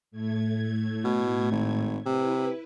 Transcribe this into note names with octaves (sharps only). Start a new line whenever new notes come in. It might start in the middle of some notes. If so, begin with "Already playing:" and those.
A2 A3 G#6
B2
G#1
C3 E4 B4